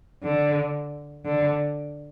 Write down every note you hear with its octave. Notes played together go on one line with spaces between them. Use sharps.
D3
D3